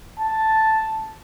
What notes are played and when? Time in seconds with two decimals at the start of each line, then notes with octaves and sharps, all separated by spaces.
0.20 A5